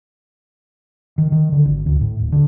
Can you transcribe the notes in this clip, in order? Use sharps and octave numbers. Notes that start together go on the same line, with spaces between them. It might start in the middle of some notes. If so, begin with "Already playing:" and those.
D#3
D#3
D3
G#1
D2
A2
D#1
D3